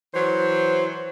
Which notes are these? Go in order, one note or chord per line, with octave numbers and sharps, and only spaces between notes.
E3 F#3 C5